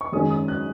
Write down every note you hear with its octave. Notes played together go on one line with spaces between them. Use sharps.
C#6
F#2 D#3 G#3 C#4 D#6
D#6
F#6